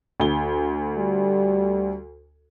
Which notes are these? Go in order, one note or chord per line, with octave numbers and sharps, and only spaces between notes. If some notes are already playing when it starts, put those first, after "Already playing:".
D2 G7
G3